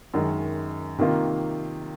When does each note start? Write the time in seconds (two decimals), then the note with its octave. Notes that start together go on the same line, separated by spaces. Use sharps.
0.14 F#2 D#3 G#3
0.98 C3 D#3 A#3 F4